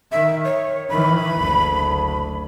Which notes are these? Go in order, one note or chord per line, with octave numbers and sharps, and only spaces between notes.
D#3 E5
C#5
D#3 E3 B5
F#1 D2